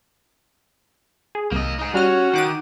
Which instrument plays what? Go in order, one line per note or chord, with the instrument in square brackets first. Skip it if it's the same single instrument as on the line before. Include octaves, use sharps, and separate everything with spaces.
[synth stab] G#4
[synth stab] C2 [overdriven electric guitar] A#3 D#5
[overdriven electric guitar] D#4 G#4
[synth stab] G3 F6 [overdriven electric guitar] C#4 [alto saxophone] F#4
[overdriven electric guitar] D#3 [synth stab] F#5 D6 D#7